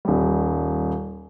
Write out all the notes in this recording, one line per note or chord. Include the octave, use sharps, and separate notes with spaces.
D#1 G3